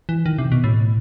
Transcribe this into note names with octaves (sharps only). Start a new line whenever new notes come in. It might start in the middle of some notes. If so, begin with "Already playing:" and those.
E3
D#3
C3
B2
A2